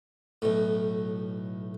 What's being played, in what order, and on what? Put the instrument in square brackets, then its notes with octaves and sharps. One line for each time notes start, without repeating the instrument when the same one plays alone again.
[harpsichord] B1 A2